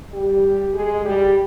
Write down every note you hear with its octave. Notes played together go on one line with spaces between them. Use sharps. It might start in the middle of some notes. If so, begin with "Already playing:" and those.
G3 G4
G#3 G#4
G3 G4